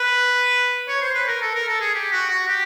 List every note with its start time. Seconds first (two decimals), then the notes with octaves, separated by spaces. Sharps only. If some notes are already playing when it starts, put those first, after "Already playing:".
Already playing: B4
0.88 C#5
1.02 C5
1.14 B4
1.28 A#4
1.42 A4
1.55 A#4
1.68 A4
1.81 G#4
1.95 G4
2.12 F#4
2.30 F#4
2.47 G4